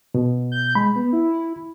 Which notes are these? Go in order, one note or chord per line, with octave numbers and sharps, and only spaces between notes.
B2
G6
G#3 B5
B3
E4